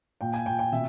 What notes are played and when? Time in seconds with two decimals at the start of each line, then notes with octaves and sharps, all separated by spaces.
0.21 A#2 G5
0.34 G#5
0.46 A#2 G5
0.59 G5
0.72 B2 E5